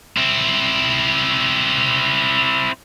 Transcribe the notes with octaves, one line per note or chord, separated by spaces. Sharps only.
C4 E4